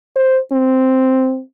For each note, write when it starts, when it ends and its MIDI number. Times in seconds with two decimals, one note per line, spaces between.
0.16 0.39 72
0.52 1.41 60